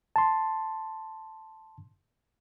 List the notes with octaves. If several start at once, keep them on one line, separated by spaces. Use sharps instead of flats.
A5 C6